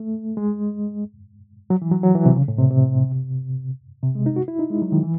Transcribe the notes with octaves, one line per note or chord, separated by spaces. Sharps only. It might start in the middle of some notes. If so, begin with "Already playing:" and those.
Already playing: A3
G#3
F#3
E3
F#3
F#3
E3
C3
C#3
A2
C3
C3
C3
G#3
D#4
F#4
E4
D#4
G#3
F#3
D#3
E3